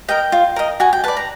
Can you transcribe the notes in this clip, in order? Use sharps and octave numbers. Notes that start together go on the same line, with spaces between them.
A#4 D#5 G5
F4
A#4 D#5
F#4 G#5
G5
B4 D5 A5
A#5